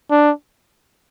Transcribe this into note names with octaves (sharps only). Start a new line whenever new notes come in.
D4